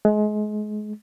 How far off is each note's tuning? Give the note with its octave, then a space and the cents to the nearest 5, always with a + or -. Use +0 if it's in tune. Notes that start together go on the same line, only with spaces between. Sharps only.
G#3 +30